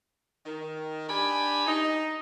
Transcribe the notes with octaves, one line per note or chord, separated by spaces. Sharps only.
D#3
D4 G4 G#5 B5
D#4